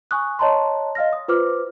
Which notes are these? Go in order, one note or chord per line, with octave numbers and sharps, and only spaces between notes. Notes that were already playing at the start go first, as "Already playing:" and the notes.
G#5 C#6 D#6 F#6
C#5 D#5 A5 A#5 C6
D#5 F5 F6 A#6
D#6
F4 B4 C5 D6 F6